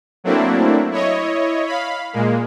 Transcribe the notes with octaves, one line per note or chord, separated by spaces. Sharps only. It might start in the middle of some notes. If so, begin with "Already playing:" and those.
F#3 A3 A#3 C4 D4 E4
E4 C#5 D#5
F5 B5
A#2 G#3 A#3